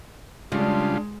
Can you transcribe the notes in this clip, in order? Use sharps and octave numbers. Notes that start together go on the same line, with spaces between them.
C#3 G3 G#3 D4 F4 F#4